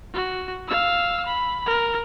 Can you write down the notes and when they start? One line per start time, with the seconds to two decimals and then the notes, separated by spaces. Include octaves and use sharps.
0.14 F#4
0.68 F5 E6
1.26 B5
1.66 A#4